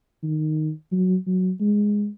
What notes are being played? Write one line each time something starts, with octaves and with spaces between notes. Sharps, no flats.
D#3
F#3
F#3
G#3